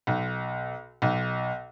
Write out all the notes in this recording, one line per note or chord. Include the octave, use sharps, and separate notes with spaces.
B1
B1